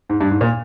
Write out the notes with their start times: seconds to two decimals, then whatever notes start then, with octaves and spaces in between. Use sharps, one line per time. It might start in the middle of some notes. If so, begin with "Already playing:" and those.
0.09 G#2
0.21 G2
0.31 G#2
0.41 A#2